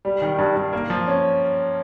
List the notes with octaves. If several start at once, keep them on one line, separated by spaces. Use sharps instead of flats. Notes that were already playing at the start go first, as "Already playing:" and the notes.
G3
D#3
G2
G2
A#3
F3
C#4